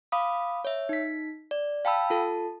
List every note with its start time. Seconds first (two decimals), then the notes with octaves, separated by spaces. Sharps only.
0.12 F5 B5 D6 D#6
0.65 C#5 E5
0.89 D#4 B6
1.51 D5
1.85 F5 G5 A5 B5 E6
2.10 F4 A4 A5